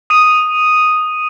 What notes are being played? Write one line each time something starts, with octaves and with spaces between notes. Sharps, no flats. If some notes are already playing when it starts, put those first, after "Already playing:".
D#6 D#7